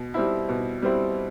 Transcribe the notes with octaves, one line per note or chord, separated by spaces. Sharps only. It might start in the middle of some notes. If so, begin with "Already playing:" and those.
Already playing: B2
G3 C4 E4
B2
G3 C4 E4